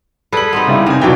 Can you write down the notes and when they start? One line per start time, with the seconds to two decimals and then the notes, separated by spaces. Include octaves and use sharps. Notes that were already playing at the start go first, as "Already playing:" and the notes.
0.32 G3 G#4 A4 B4 F#7
0.53 B3 C4 D#4
0.67 C#3 G3 E4
0.86 C3 D#3 G#5
1.01 B1 E3 F#3 D4 G5